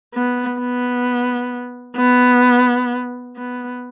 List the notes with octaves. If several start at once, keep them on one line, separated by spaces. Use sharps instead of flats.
B3
B3
B3
B3